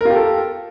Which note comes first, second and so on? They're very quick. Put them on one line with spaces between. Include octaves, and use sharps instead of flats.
A#4 F4 G4 A4